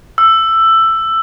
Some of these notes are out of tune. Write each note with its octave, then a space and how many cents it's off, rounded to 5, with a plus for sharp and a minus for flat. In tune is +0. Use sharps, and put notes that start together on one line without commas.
E6 +10